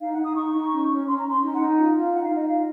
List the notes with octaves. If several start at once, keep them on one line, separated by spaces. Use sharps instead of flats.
D#4 F5
F#5
D#4
D#6
D#4 C#6
D#4
C#4
C#4
C#4 C6
A#5
C#4
C6
D#4
F#5
D#4
F4
F4
D#4 F#5
F5
D#4
D#5
F4 F5